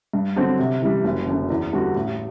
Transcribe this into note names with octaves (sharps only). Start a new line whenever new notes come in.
G2
D3 F#3 C4 F#4
C3
E3 G3
F#1
F#2 D3
E2
D3 G3 B3 F#4
A1